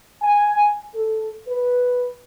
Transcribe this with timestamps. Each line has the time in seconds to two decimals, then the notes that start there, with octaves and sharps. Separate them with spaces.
0.22 G#5
0.95 A4
1.48 B4